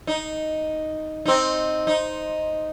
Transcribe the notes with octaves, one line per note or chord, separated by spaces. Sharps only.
D#4
C4 D#4
D#4